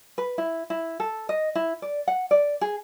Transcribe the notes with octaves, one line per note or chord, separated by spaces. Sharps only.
B4
E4
E4
A4
D#5
E4
D5
F#5
D5
G#4